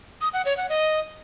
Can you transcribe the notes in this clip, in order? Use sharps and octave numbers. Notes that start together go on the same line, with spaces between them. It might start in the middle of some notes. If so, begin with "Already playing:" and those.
D#6
F#5
C#5
F#5
D#5